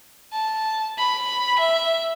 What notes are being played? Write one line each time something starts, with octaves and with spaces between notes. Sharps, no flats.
A5
B5
E5